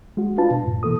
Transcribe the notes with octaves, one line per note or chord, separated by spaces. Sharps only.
G#3 F#4
D4 F4 B4 A5
B2
F#2 A2
B2 E3 A#3 A4 D#6